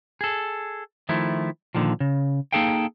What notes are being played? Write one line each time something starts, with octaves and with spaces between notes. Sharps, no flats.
G#4 A4
D#3 F3 A3 E4
A#2 D3 D#3 F3
C#3
A#3 D#4 G#4 A4 F5 G5